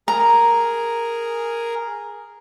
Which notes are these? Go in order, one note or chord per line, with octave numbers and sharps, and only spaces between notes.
G#4 A#4 A#5